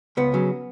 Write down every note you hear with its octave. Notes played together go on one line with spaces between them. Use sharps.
C#2 B3
C#3 F#3